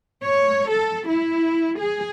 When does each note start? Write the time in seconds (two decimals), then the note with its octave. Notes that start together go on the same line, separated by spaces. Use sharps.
0.23 C#5
0.69 A4
1.08 E4
1.79 G#4